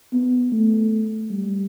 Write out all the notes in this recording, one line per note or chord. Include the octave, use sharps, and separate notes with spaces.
B3
A3
G3